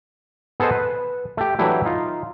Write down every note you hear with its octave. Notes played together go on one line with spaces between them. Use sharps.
B3 G#4 A4 C5 D#5
B4
A3 G4
E3 F#3 A3 D4 E4 G4
D#4 F4